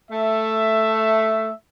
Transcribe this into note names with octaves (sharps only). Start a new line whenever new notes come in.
A3 E5